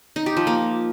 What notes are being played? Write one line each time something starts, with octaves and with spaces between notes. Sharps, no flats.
D#4
G4
F3
A#3